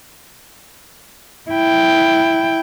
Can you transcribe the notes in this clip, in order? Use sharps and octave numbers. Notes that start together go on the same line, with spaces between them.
E4 G5